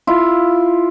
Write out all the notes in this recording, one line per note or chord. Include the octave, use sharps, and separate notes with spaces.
E4 F4